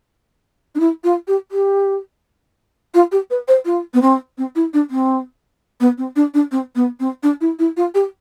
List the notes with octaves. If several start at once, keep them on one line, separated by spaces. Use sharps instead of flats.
D4
E4
F4
G4
G4
F4
G4
B4
C5
F4
B3
C4
C4
E4
D4
C4
B3
C4
D4
D4
C4
B3
C4
D4
E4
E4
F4
G4